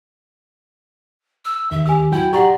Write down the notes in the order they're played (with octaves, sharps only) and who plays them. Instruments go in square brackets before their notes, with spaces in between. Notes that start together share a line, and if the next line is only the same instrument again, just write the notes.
[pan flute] E6
[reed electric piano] D#2 D#3 [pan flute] E5
[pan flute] G4 [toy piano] G#5 E6
[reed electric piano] F#3 F#4 G5 [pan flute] E4
[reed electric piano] G4 A#5 [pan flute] D5 [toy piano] F#5 C6 C#6